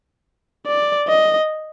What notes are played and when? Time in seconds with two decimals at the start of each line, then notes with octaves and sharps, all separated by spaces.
0.68 D5
1.08 D#5